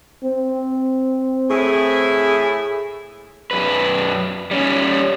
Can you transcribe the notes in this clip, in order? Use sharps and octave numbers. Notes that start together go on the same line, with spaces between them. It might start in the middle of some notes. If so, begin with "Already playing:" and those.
C4
A2 E4 G#4
F#2 B4
G3 C#4